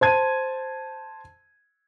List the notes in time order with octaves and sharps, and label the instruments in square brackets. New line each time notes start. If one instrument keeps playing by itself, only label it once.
[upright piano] C5 A5 G#6 D#7